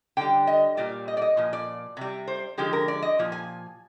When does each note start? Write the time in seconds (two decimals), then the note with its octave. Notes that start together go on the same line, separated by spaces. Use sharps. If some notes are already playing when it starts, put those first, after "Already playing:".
0.17 D3 G3 G5
0.47 D#5
0.77 A#2 G3 D5
1.08 D#5
1.17 D5
1.22 D#5
1.37 A#2 F3
1.53 D5
1.97 C3 G3
2.28 C5
2.58 D3 F3 G#3 G4
2.73 A#4
2.88 D5
3.02 D#5
3.19 A#2 F3
3.32 G#5